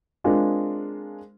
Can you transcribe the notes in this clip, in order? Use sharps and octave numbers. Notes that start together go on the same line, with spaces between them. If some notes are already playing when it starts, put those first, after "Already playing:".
G#3 C4 D4 F4 G#4 A#4